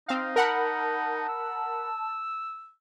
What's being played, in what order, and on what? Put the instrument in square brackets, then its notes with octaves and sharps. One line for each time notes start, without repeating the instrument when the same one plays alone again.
[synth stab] C4 F5 [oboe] D#4
[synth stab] A#4 F#5 B5 [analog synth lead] A5
[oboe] E6